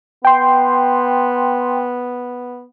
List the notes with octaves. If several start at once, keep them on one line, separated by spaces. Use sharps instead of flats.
B3 G5 C6